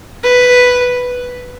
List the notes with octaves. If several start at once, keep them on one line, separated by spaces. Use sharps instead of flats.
B4